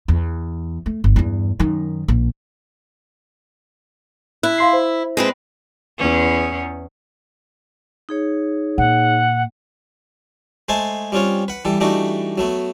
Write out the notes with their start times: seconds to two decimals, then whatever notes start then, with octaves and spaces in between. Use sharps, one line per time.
0.08 E2
0.86 A3
1.04 G1
1.16 E2 G2
1.60 F#2 D#3
2.08 A#1
4.43 E4 F#6
4.58 F5 C6 C7
4.73 C5
5.17 G#3 C4 B4
5.98 E2 C#4
8.09 D#4 G#4 C#5
8.78 A#2 F#5
10.69 G#3 A3 C5 G#5 A5
11.12 G3 C4 C#4 F4 C#5
11.48 B4 F#5
11.65 E3 G3 A4
11.80 E3 G3 A3 D4 D#4 F#4
12.38 F#3 A3 B3